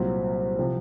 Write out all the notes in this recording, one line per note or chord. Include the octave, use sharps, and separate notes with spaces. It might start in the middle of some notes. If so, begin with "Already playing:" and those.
Already playing: C2 A#2 F#3 C4
C3 F3